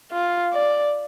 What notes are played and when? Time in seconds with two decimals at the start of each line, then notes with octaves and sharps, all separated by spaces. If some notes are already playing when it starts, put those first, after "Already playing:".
0.12 F4
0.54 D5